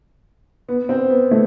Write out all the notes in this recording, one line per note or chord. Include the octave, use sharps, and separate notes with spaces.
B3
C4
B3
A3